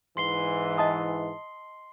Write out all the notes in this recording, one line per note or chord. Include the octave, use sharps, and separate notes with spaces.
G#2 E3 C6 C7 G7
D#5 A5 D#6